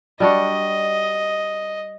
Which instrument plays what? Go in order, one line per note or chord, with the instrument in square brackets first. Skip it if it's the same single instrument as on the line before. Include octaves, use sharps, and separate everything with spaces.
[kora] G3 D4 F#4 [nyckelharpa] D#5